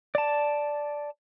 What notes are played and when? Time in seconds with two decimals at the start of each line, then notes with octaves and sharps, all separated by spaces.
0.15 D5 A5